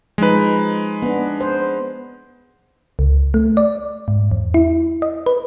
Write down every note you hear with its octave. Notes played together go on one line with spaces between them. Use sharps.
F3 G#3 D#4 B4
B3 D4
C5
C#2
A3
D5
G#2
E2
E4
D#5
B4